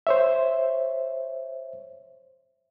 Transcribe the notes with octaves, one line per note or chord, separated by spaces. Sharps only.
C5 C#5 E5